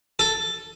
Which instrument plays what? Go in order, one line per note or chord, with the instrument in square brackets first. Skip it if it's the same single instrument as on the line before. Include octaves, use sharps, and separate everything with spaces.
[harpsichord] A4